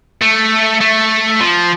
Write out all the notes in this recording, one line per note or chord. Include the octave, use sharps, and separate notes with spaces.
A3
A3
F3